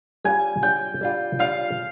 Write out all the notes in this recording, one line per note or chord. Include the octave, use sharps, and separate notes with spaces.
G3 D4 F4 G#5
G3 D4 F4 G5
G3 D4 F4
G3 D4 F4 F5